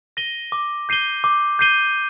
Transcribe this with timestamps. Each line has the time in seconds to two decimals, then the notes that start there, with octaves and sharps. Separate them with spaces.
0.17 A#6 D#7 G7
0.52 D6
0.89 G6 C7 D#7 G7
1.24 D6
1.59 G6 C7 D#7 G7